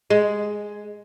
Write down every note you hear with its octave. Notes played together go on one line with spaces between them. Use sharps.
G#3